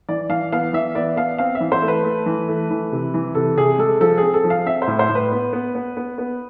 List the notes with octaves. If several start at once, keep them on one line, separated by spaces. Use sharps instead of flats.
E3 D5
E3 F5
B3 F5
E3 E5
B3 D5
B3 F5
C4 F5
E5
E3
C5
A3
B4
A3
E3
A3
E3
C3
E3
C3 A4
C3 G#4
G#3 A4
F3 A4
C4 G#4
A4
F3
F5
C4 E5
C5
A2
C5
A2
B4
B3
B3
B3
B3
B3